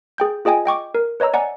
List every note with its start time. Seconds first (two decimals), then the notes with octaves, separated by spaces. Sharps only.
0.18 G#4 G5 G6
0.45 F4 G#4 D#5 G5 G#5
0.65 D#5 G5 C#6 D6
0.95 A#4
1.20 B4 C#5 D#5 A#5 E6
1.34 D5 F#5 G#5 A#5